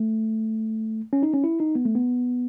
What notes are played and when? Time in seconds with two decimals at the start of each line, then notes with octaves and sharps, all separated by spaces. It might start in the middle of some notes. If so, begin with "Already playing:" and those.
Already playing: A3
1.13 C#4
1.23 D#4
1.34 C#4
1.44 E4
1.60 D#4
1.75 B3
1.85 A3
1.95 B3